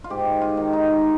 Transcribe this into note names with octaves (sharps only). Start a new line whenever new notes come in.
F4
G#2 G4
F4
D#3
D#4